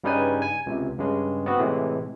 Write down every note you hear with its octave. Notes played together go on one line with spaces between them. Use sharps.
G2 C#3 G3 D#4 B4 G#5
G#5
C#2 C3
G2 C#3 G#3
B3 C4 F#4
A2 C3 E3 G#3